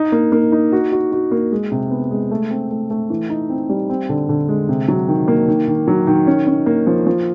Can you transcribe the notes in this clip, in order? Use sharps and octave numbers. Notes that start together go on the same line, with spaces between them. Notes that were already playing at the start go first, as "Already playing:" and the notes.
Already playing: D#4
A#3
A#3
D#4
F#4
F#4
F#4
A#3
G#3
C3
B3
G#3
A3
C4
A3
A3
E3
D#4
C4
G3
C4
D3
D3
G#3
C3
F#3
D#3
A#3
D#3
D#3
F#3
D#3
C#4
C#4
A#3
F3
F3